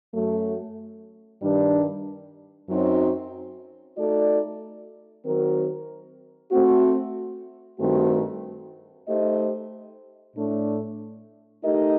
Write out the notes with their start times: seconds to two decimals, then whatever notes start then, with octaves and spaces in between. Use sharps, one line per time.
0.13 F#2 F#3 A3
1.41 G2 D#3 G3 D4
2.68 F#2 F#3 C4 D#4
3.96 A3 D#4 F#4 A4 D5
5.24 D#3 F#3 C4 F#4 A#4
6.52 A3 C4 F#4
7.79 G2 D#3 A3 C4 F#4
9.07 A3 D#4 G4 C5 D#5
10.35 A2 A3 D4
11.63 A3 D#4 G4 A#4 D#5